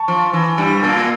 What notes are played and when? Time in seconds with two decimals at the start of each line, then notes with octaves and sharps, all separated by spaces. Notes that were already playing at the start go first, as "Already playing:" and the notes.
Already playing: A5 C#6
0.08 F3
0.33 E3
0.58 G2 G3
0.83 A#2 A#3